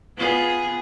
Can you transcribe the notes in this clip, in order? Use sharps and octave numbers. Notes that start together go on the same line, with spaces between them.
B3 F4 G#4